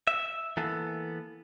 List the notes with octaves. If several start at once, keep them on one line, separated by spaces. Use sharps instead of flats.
E5
E3 A#3 B3 A4